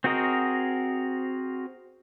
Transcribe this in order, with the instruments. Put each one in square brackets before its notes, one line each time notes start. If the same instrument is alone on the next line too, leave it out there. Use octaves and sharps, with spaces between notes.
[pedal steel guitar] C4 F#4 G#4 A#4 D#5